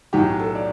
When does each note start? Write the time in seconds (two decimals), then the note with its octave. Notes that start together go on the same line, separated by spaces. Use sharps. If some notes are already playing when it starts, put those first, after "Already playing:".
0.13 B1 A2 F#3 G4
0.39 A4
0.55 D5